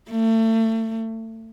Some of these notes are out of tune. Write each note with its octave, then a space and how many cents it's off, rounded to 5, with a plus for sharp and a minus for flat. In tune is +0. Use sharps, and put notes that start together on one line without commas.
A3 +30